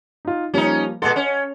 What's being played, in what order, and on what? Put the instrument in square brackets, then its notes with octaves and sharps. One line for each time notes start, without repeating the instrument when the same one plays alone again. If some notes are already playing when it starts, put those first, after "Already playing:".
[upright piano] D#4 F4
[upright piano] F3 G3 A#3 [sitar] C#4 D#4
[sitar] A#2 G#3 A4 [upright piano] D#5 F#5 C6
[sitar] C#4